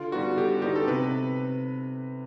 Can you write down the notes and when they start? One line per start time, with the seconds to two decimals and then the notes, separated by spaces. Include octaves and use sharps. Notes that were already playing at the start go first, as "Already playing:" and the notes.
Already playing: D3 F4
0.12 G3 B3 D#4 F#4
0.37 D3 G4
0.62 G3 B3 D#4 G4
0.75 A4
0.87 C3 B4